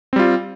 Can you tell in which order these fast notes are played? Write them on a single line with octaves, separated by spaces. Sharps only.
C4 G3 F4